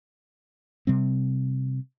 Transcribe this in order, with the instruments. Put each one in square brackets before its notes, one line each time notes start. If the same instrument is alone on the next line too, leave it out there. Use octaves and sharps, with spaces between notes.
[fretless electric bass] C3 G3 C4